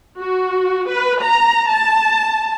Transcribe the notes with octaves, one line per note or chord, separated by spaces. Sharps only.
F#4
B4
A#5
A5